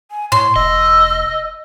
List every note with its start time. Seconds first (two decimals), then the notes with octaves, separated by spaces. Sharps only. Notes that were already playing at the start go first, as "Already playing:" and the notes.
0.11 G#5
0.32 A2 C#5 C6
0.56 E1 D#5 E6